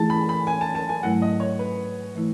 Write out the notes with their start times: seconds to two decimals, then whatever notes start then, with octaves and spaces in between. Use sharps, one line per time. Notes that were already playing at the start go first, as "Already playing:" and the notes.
Already playing: E3 A3 E4 G#4 A5
0.10 B5
0.29 B5
0.47 G#5
0.61 A5
0.75 A5
0.89 G#5
1.03 G#2 F#3 A3 E4 F#5
1.22 D#5
1.40 C#5
1.59 B4
2.15 E3 A3 E4